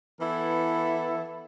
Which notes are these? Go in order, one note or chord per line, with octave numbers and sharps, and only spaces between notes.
E3 B3 E4 A4